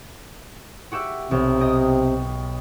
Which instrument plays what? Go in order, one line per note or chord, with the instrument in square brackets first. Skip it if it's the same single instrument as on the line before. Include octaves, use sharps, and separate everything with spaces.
[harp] F#4 G4 E5
[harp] B1 [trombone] C3
[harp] D#5 G5